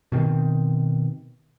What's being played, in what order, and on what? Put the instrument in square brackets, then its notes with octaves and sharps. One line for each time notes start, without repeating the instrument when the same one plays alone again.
[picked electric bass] B2 D#3 C4